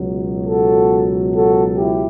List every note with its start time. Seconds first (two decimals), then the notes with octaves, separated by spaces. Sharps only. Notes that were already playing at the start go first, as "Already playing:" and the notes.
Already playing: C#2 B2 F#3
0.46 F#4 A4
1.35 F#4 A4
1.77 E4 G4